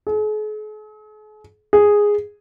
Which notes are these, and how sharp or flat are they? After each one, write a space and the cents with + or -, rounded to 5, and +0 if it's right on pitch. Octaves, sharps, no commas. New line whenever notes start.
G#4 +45
G#4 -5